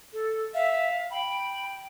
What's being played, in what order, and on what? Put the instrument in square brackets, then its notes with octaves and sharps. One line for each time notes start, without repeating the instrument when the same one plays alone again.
[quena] A4
[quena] E5 [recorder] F5
[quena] G5 [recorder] B5